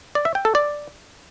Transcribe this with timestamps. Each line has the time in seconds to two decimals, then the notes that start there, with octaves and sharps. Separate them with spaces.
0.15 D5
0.25 E5
0.35 G5
0.45 A4
0.55 D5